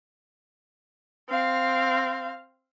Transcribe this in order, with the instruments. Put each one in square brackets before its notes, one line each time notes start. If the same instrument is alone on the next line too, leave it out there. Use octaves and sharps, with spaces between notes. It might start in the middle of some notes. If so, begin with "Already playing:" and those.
[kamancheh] C4 F5